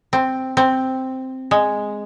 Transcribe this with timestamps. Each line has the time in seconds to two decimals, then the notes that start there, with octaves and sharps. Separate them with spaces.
0.13 C4
0.57 C4
1.51 G#3